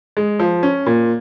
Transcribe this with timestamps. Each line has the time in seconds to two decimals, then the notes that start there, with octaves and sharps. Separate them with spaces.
0.17 G#3
0.39 F3
0.63 C#4
0.86 A#2